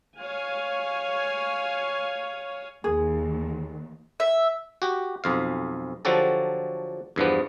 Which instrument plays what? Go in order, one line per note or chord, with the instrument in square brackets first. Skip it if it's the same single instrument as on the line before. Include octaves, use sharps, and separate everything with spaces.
[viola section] C#5 F5 G#5
[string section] D#2 D#3 [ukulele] G#4
[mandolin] E5
[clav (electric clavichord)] F#4 G4
B1 F2 F5
D3 F3 F#3 F#4 G4 A4
E2 G2 F3 B3